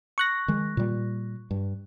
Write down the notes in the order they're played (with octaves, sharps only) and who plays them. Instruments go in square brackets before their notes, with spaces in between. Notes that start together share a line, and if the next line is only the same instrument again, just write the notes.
[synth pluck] C#6 F#6 A#6
[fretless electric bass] D#3 G#3
A#2 G3
G2